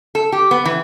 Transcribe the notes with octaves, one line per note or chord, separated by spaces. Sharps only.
A4
G4
B3
E3